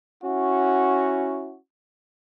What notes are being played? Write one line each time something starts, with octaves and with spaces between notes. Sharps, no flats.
C#4 E4 F#4